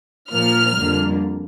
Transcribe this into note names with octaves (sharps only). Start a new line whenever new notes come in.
A#2 F3 A#3 F6
F2 D3 G3 A#3